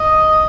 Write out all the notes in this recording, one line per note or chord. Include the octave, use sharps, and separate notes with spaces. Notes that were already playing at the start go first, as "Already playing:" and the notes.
Already playing: D#5